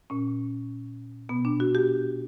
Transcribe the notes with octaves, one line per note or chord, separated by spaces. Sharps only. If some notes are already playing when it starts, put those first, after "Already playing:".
A#2 C#4
B2 B3
D4
F#4
G4